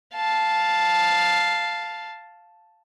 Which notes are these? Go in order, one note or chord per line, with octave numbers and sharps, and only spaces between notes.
F5 A5